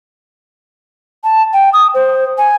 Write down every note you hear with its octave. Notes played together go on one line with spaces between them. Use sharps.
A5
G5
D#6
C5
G#5